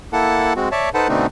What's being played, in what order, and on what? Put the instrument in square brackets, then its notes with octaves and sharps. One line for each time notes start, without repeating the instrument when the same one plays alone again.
[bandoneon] A#3 E4 A4 F#5 A5
G#3 C4 F#4
C#5 D5 E5 A5
D#4 A4 B4 C5 F#5 A5
B2 D3 A3 C4 D4 D#4